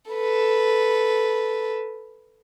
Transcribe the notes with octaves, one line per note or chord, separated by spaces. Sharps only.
A4 B4